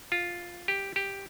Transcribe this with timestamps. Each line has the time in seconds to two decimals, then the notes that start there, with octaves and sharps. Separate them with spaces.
0.12 F4
0.68 G4
0.96 G4